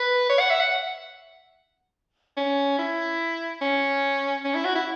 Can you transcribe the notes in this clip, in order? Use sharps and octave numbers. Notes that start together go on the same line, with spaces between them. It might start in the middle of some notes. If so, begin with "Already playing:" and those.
Already playing: B4
C#5
F#5
E5
F#5
C#4
E4
C#4
C#4
E4
F#4
E4